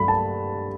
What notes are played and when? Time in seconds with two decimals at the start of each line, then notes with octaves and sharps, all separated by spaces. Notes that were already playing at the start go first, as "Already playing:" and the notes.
Already playing: G2 F#3 A3 B5
0.08 A5